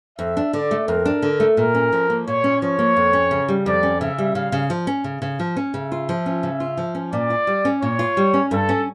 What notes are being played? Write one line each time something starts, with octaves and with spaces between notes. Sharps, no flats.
F2 E5
D4
D3 D5
A3
F2 A#4
D4
D3
A3
A#2 A#4
C#4
F3
A#3
A#2 C#5
C#4
F3 C#5
A#3
F2
C#4
C#3
G3
F2 D5
C#4
C#3 E5
G3
C#3 F5
C#3
F3
C#4
C#3
C#3
F3
C#4
C#3 E5
F4
F3
C#4
C#3
F4
F3
C#4
A#2 D5
F4
G3
C#4
A#2 C#5
F4
G3
C#4
G2 A4
C#4